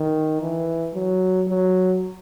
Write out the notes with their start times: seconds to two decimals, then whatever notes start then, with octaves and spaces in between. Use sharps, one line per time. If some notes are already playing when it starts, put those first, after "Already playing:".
Already playing: D#3
0.41 E3
0.94 F#3
1.47 F#3